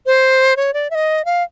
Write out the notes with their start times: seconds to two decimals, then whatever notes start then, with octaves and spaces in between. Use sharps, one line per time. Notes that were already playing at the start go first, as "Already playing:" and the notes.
0.06 C5
0.57 C#5
0.74 D5
0.91 E5
0.95 D#5
1.25 F5